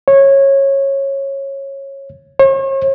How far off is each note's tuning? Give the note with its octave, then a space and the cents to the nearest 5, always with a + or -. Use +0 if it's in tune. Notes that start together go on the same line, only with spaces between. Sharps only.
C#5 -20
C#5 -45